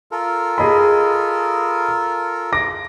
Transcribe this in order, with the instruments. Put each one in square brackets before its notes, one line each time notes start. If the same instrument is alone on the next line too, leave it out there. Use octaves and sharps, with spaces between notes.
[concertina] F4 A4 A#4
[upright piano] G#4 D#5 B5
D6 A#6